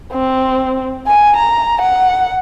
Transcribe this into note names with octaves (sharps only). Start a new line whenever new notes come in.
C4
G#5
A#5
F#5